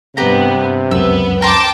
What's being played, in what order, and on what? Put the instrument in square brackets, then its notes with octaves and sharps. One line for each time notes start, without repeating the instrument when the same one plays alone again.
[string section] G2 B3 [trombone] C3 [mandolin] G4 A#5
[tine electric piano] C#2 F#2 [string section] B3 [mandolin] E6
[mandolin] A#4 C5 [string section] G5 A5 D6